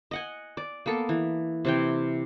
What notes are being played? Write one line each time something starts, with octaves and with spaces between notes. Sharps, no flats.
D#5 F#5 G#5
D5
A#3 B3 A4
E3
C3 E3 G5